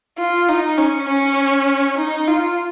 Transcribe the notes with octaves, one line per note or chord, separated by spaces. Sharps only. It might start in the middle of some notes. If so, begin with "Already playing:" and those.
F4
D#4
C#4
C#4
D#4
F4